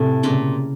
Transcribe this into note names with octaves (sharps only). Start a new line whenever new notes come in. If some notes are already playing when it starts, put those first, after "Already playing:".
Already playing: A2 C3
A#2 C#3